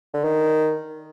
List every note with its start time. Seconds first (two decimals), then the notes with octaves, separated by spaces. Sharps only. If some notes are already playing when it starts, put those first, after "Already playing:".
0.14 D3
0.24 D#3